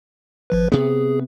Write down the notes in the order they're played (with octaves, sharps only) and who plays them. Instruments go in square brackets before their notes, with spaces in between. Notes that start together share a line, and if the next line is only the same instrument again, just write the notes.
[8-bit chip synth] G#1 F3 B4
[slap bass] C3 B3 [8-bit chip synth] G#4